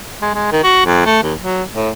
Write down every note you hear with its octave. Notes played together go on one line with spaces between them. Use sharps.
G#3
G#3
D#3
F#4
F2
A3
D#2
F#3
A2